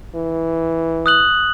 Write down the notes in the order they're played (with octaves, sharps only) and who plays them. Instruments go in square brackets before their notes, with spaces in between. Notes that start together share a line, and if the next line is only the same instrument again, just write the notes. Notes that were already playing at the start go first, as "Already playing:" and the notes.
[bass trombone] E3
[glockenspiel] D#6 F#6 F#7